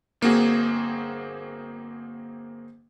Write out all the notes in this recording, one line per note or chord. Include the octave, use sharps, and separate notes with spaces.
G1 A#3 C4 F#4 G#4